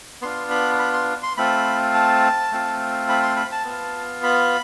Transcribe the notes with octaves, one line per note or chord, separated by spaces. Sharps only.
B3 D4 F4 C6
B5
B5
C6
C6
A3 C4 F4 B5
A5
A3 C4 F4
B5
C6
B5
A5
B3 F4
B5